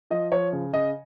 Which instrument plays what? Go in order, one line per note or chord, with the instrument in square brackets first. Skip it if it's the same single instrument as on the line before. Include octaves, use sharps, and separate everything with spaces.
[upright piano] F3 D#5
F3 C#5
C#3
C#3 D#5